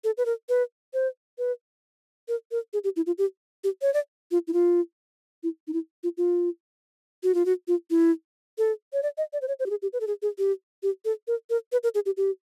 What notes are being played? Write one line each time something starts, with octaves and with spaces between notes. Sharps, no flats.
A4
B4
A#4
B4
C5
B4
A#4
A#4
G#4
G4
E4
F4
G4
G4
C#5
D5
F4
E4
F4
E4
D#4
E4
F4
F4
F#4
F4
F#4
F4
E4
A4
C#5
D5
D#5
D5
C5
C#5
C5
G4
G#4
G4
B4
A4
G#4
G#4
G4
G4
A4
A#4
A#4
B4
A#4
G#4
G4
G4